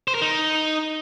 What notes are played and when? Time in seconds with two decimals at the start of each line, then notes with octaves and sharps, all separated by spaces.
0.08 C5
0.15 A#4
0.22 D#4